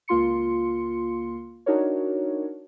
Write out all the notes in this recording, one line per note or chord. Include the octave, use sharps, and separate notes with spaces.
C#2 A#3 F4 C6 C#7
D4 D#4 F#4 A#4 C#5